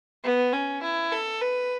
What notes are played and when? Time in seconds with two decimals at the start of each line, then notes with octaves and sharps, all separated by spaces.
0.24 B3
0.53 C#4
0.83 E4
1.12 A4
1.42 B4